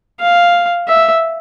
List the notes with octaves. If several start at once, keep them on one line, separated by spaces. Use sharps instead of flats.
F5
E5